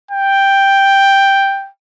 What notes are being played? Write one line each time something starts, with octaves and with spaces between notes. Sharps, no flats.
G5